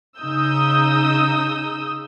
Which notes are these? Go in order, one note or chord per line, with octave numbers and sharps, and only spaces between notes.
C#3 D#4 D#6 E6 G6